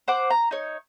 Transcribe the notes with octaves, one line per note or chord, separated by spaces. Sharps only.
C5 F#5 D6
A#5
D#4 C#5